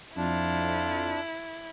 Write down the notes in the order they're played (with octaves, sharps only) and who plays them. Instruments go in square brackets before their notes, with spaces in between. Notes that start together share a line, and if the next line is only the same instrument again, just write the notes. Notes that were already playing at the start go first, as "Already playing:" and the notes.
[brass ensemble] F2 [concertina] D4 [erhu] E4 [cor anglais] F4